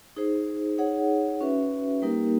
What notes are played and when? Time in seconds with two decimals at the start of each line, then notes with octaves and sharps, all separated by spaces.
0.16 D#4 G#4 C5
0.78 D#4 G#4 C#5 F#5
1.41 C#4 F#4 B4 E5
2.02 G3 A#3 D#4 G4 A#4